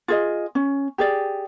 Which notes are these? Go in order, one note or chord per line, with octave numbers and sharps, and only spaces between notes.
F4 G#4 D#5
C#4
G4 G#4 D5